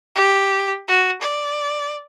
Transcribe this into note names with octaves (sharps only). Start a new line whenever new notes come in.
G4
F#4
D5